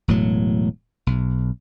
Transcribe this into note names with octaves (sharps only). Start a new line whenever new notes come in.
E1 A2 F#3
B1